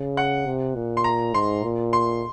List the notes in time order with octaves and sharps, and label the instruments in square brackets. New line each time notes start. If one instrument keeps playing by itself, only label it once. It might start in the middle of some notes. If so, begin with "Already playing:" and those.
Already playing: [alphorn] C#3
[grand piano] F#5
[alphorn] C3
A#2
[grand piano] C6
A#5
[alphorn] G#2 [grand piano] C6
[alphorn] A#2
[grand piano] C6